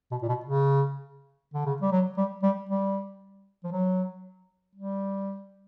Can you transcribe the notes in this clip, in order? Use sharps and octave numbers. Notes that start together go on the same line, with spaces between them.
B2
A#2
B2
C#3
D3
C#3
G3
F#3
G3
G3
G3
F3
F#3
G3